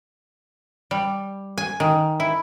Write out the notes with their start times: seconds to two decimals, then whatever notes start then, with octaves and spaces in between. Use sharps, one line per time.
0.91 G3
1.58 G#5
1.80 D#3
2.20 E4